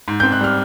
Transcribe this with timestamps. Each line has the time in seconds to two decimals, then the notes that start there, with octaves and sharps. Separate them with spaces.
0.08 G#2
0.20 C4 G6
0.32 F#6
0.41 G3 F6